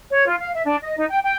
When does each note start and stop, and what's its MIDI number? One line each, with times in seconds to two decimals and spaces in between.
0.10 0.26 73
0.26 0.34 65
0.39 0.53 77
0.53 0.60 76
0.65 0.75 62
0.81 0.93 75
0.96 1.04 63
1.08 1.19 79
1.22 1.37 79